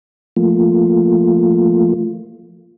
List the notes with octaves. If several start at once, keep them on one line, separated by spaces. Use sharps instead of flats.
F3 A3 A#3 F4